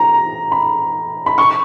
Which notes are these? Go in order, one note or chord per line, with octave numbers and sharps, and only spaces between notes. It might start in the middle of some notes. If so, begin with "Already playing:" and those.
Already playing: A#5
B5
B5
C#6